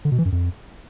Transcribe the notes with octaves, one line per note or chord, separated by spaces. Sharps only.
D3
B2
E3
F#2
F2